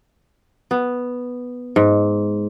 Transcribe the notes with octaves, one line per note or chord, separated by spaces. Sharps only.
B3
G#2